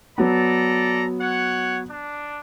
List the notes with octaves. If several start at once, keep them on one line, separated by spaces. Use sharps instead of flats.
F#3 B3 A4 D5 A#5
C#5 F#5
D4